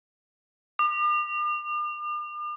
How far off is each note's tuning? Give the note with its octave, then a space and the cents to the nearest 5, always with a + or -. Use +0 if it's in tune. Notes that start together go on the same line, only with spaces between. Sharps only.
D6 +45